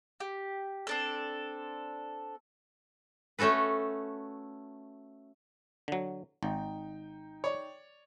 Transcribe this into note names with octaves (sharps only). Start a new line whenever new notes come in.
G4
C4 D4 A4
A3 C#4 F#4 A4 B4
D3 F#3
G#1 D#4 G5
C#5 D5